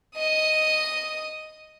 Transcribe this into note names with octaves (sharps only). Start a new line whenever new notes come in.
D#5 D#6